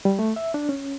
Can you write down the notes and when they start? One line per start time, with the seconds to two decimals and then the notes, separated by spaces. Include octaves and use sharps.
0.05 G3
0.19 A3
0.36 E5
0.54 D4
0.69 C#4